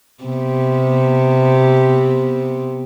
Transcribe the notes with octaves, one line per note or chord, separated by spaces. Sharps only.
C3 B3